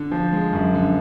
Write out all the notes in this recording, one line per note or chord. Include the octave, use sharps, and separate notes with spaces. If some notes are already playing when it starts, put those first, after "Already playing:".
Already playing: D3
F3
G#3
F#2
D3